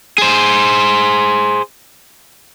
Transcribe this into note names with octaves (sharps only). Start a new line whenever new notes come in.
G#4 C5